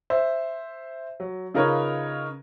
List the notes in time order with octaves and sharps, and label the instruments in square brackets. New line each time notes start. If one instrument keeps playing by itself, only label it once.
[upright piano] C5 E5
F#3
C#3 D#4 F4 A#4 B4 C#5